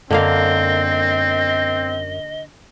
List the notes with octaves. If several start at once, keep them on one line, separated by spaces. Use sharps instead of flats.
F#2 D3 A#3 C4 D#5 F5